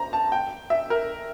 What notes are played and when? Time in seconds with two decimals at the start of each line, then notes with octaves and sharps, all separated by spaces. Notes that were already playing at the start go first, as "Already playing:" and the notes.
Already playing: C5 A#5
0.13 A5
0.32 G5
0.70 E5
0.90 A#4